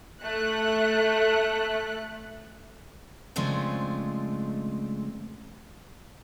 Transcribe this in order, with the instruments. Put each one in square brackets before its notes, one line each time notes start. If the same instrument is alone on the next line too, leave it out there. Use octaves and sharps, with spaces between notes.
[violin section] A3 F#6
[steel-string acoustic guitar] C#3 F3 G#3 A3 C4 D4